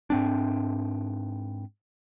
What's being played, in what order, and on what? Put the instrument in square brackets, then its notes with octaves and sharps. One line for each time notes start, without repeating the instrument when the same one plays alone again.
[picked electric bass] G#2 C4 D4